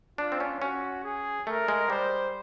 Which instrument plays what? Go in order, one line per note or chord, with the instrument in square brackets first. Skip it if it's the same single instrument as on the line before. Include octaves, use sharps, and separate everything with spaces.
[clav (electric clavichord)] D4 [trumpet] F4
[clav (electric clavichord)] C4
C#4
[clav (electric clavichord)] C#4 [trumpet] F#4
[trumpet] G#4
[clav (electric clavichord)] A3 [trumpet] A#4
[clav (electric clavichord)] G#3
[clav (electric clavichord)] G3 [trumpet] C5